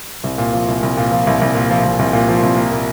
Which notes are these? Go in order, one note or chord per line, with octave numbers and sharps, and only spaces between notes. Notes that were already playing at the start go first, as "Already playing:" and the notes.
C2
A#2
F3
C2
C2
A#2
F3
C2
C2
A#2
F3
C2
C2
A#2
F3
C2
A#3
A#2